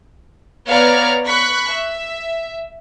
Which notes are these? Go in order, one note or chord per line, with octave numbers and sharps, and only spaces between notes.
B3 C#5 D5 F5 A#5 F6
B5 C#6 F#6 B6
E5